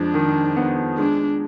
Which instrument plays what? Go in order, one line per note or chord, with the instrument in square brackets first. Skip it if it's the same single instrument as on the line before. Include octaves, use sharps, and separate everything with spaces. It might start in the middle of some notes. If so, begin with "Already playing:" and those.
Already playing: [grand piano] F2 G#3 [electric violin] D4
[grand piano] D#3
B3
[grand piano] G#3 [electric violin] D4